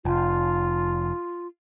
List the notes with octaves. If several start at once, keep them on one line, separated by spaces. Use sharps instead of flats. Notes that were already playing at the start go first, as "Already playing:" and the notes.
F1 F4